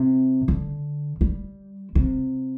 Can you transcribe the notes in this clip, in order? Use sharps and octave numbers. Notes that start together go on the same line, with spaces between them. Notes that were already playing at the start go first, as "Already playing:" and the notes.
Already playing: C3
D3
G3
C3